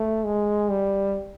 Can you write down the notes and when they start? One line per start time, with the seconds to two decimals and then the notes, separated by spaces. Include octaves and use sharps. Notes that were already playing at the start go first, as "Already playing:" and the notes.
Already playing: A3
0.24 G#3
0.70 G3